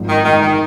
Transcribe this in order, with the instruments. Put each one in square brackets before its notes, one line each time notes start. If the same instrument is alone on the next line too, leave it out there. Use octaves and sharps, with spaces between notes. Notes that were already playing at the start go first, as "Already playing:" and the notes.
Already playing: [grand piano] G#1 G#2 F3
[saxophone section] D#3
[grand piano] G#2 G#3 D#4 [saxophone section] D#3
[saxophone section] D#3